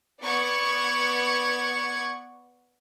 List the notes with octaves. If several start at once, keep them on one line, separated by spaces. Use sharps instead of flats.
B3 D5 F#5 C#6 G#6 C#7